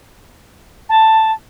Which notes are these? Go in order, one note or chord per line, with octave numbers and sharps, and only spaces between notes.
A5